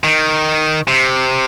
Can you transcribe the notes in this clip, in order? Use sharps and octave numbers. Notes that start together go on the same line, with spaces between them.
D#3
C3